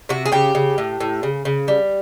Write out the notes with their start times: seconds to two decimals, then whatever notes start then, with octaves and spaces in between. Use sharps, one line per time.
0.09 C3 F#4
0.26 G#4
0.32 C#3 G4
0.55 C#3
0.78 A2
1.01 A2
1.23 C#3
1.45 C#3
1.68 G3